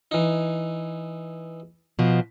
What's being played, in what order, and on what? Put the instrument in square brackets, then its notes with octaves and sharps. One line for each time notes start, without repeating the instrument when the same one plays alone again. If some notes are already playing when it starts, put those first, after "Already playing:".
[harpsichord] E3 D#4
[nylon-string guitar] B2 F3